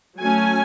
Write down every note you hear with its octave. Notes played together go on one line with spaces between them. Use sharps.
F#3 A3 C#4 G#5